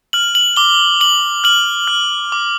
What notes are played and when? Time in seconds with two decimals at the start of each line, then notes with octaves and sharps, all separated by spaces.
0.13 F6 F#7
0.35 F#7
0.56 D6 G7
1.01 D6 F#7
1.44 F6 F#7
1.88 F6
2.32 D6